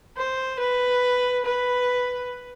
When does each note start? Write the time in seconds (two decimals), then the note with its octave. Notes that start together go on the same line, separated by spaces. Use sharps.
0.17 C5
0.60 B4
1.45 B4